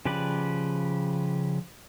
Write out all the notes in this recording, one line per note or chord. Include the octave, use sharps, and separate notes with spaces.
C#3 F3 G4 B4 D5